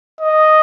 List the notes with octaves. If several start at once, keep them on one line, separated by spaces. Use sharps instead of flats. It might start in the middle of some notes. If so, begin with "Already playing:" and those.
D#5